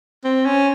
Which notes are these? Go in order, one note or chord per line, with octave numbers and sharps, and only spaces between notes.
C4
C#4